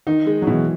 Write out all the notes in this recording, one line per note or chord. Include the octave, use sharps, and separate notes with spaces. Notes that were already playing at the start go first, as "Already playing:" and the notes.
D#3 D#4
G#3
F#3
B2 E3